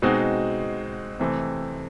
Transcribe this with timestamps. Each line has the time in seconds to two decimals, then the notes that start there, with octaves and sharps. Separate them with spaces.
0.02 B2 G#3 C4 D#4 F#4
1.19 C3 E3 A3 C4